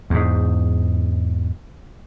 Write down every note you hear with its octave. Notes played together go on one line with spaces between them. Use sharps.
E2 G#2